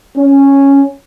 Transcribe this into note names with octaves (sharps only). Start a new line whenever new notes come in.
C#4